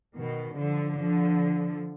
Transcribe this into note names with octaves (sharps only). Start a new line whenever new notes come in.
B2 D#3
D3 F3
D3 F3